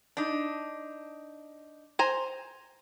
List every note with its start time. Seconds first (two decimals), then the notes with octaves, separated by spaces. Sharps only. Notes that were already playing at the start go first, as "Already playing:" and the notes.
0.17 D4 D#4
1.99 C5 G#5 A#5